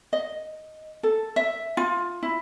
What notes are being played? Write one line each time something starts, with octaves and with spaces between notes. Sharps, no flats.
D#5
A4
E5
F4
E4